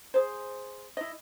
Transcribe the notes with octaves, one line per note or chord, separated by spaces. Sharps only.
G#4 C5
E4 D#5